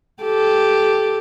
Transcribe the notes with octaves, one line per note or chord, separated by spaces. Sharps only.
G4 A4